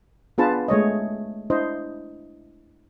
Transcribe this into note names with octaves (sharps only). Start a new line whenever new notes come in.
B3 D4 F4 G#4 B4 A5
G#3 A3 C#5 D#5
D4 E4 C5 D#5